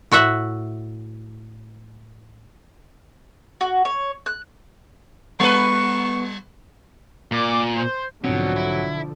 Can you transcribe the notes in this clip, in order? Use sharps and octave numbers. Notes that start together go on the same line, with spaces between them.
A2 F#4 E5 F#5
F#4
C#5
F#6
G3 B3 B4 C#6
A#2 D5 D6
C5
B1 G#2 B2 D3 F3 F#3 C4
E4